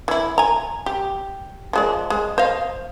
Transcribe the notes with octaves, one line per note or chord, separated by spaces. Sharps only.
E3 E4
G#5 A#5
G4
F3 G#3 D5
G#3
C5 D#5 F5